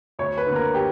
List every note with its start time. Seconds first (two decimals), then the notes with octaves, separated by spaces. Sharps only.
0.19 D2 C#5
0.38 B4
0.46 D3
0.51 A#3 A#4
0.75 G4